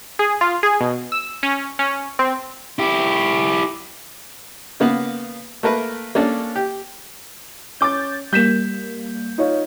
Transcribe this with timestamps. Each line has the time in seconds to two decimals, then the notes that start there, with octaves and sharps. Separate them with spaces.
0.19 G#4
0.41 F4
0.63 G#4
0.80 B2
1.12 E6
1.43 C#4
1.79 C#4
2.19 C4
2.79 E4 G4
4.80 C#3 A#3 B3
5.63 A3 A#3 A#4 B4
6.15 A#3 C#4 D4 A4
6.56 G4
7.81 C#4 D6 G6 A6
8.33 G3 A#3 G6 B6 E7
9.38 D#4 F4 C#5